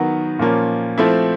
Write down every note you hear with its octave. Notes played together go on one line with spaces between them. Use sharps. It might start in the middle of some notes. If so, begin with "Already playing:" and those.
Already playing: D#3 F#3 B3
A#2 F3 A#3 C#4
F3 A3 C4 E4